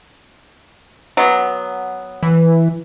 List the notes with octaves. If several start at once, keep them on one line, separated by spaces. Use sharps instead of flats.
F#3 B3
E3